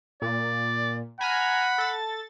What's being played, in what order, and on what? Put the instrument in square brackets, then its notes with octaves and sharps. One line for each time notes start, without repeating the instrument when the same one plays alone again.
[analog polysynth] A#2 [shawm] D5
[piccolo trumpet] F#5 [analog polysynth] G#5 A#5 F6 [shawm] B5
[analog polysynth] A4 A6